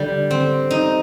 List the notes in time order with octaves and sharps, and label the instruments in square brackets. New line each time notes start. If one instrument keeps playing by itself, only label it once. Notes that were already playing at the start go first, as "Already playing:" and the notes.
Already playing: [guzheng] D3 G3
C4
D#4